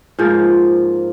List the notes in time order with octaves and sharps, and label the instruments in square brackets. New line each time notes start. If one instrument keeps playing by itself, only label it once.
[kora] G#2 F3 A#3